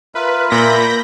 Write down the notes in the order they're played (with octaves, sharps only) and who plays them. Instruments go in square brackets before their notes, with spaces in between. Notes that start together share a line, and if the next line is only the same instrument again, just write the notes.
[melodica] F4 A#4 E5 [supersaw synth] B4
[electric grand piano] A#2 B6 [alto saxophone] A#3 [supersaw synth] B5 G6 A#6